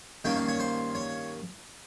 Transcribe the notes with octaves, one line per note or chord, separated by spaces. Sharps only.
G2 D#3 A#3 C#4 G5
F5
C#5
C5
C#5